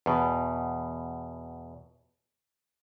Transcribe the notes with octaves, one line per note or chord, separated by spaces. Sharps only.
E2 B2